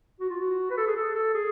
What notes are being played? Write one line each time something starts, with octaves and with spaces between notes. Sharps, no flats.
F#4
F4
F#4
B4
A4
G#4
A4
A4
G#4